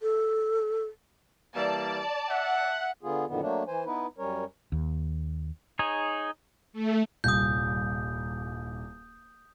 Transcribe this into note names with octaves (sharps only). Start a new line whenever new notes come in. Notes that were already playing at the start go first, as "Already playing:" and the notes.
A4
E3 G3 A#3 D5 A5
E5 F#5
D3 B3 F4 G#4
F#2 A#2 D3 D#3 B3
F#3 A3 A#3 D4
E3 C5 G#5
B3 D#4 E4 B4
F#2 G3 C#4 A#4 C#5
D#2
D#4 G#4 C#5
A3
D#1 C2 G2 D#6 G6